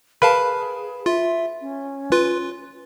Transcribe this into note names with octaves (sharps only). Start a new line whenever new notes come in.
G#4 A#4 B4 F5 A5
F4 E5
C#4
F4 B4